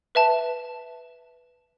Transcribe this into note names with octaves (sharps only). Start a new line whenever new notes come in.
B4 E5 A5